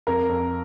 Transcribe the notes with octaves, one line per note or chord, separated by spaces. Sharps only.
F2 A#4
F2